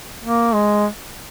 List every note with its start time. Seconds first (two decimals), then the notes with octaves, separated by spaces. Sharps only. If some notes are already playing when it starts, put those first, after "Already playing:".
0.23 A#3
0.53 G#3